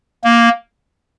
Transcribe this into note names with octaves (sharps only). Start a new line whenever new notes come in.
A#3